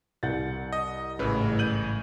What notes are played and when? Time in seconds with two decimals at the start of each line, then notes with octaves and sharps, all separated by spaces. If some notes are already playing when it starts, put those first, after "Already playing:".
0.23 C2 F#5 G6 A6
0.73 D#5
1.19 A1 G#2 C#3 E3 B4 E6
1.59 G6 D#7 F#7